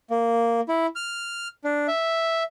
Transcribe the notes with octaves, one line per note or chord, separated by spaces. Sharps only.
A#3
E4
F6
D4
E5